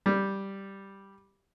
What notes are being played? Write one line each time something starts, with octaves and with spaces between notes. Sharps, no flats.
G3